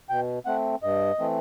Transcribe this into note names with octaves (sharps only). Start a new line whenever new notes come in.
B2 G5
A3 C4 F#5
G2 D#5
E3 A3 C4